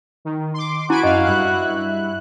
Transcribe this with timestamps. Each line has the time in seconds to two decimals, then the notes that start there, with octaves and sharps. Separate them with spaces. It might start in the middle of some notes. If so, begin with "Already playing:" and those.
0.25 D#3
0.54 C6 D6
0.90 E4 F#4 G#5 B5 D7
1.03 F#2 D#5 F5
1.25 G2 E4 F#6